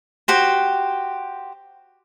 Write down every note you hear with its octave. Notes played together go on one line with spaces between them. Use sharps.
F#4 G4 C5